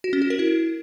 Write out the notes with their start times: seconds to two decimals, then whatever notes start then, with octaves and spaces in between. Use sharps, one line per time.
0.04 F#4
0.13 C#4
0.22 F#4
0.30 A#4
0.39 E4